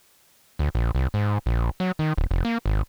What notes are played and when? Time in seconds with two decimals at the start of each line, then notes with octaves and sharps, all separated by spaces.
0.59 D2
0.75 A#1
0.95 C2
1.14 G#2
1.46 A#1
1.80 F#3
1.99 D#3
2.18 D1
2.31 F1
2.45 A#3
2.66 G#1